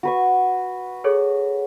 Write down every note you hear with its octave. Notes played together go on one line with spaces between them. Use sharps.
F#4 B4 C#6
G#4 A4 C#5